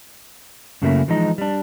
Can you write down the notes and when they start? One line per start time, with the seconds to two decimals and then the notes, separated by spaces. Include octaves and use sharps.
0.82 F#2 C#3 F#3 A3 A#3 E4
1.08 E3 F3 G#3 D#4
1.38 G3 D4